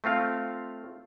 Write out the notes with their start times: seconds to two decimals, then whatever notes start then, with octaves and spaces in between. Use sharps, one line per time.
0.04 A3 C4 F4 F5